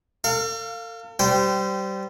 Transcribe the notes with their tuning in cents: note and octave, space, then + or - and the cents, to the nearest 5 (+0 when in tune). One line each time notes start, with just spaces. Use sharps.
A4 +45 F5 +0
G3 -20 C5 -30 G5 -10